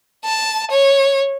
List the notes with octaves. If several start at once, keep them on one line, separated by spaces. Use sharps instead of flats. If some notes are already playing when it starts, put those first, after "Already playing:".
A5
C#5